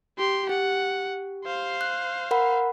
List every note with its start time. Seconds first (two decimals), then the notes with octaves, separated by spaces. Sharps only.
0.18 G4 C6
0.49 G4 F#5
1.44 C5 F5
1.81 F#6
2.31 A#4 F#5 B5